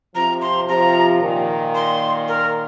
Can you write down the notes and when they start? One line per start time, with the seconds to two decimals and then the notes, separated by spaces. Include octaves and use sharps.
0.15 C3 F3 A#5
0.42 C6
0.68 C3 F3 A#5
1.21 A#2 D#3
1.75 C6
2.28 A#4